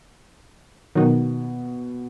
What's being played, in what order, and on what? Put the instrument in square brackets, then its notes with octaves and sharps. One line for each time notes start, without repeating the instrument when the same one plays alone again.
[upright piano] B2 [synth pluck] D#3 F#3 D#4 F#4